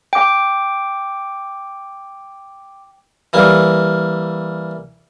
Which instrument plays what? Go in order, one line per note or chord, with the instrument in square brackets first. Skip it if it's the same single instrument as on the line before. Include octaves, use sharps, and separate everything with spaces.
[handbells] G5 D6
[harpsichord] E3 G3 A#3